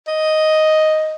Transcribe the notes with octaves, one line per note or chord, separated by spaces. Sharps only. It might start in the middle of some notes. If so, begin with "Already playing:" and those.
D#5